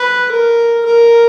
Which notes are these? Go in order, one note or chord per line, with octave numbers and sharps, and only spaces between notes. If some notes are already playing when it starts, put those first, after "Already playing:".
Already playing: B4
A#4
A#4